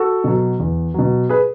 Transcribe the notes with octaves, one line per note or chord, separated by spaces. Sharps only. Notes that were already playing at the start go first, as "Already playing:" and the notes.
Already playing: F#4 A4
B2 F#3
E2
B2 F#3
G#4 B4